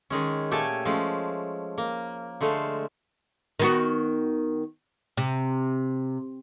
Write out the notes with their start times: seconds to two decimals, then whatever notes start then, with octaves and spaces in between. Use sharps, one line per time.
0.10 D#3 G#3 C#4
0.51 A#2 A3 G4 A4 G#5 A5
0.85 F3 G#3 A3 C#4
1.78 A#3
2.41 D3 G#3 A3 C5 F5
3.59 D#3 B3 F#4
5.17 C3